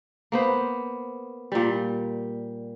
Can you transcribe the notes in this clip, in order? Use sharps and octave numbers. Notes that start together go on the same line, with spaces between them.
A#3 B3 C5
A#2 G3